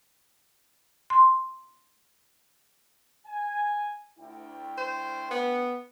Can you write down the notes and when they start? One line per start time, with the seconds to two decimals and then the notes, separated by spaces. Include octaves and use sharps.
1.10 C6
3.26 G#5
4.19 D2 E4 G5
4.78 C5
5.31 B3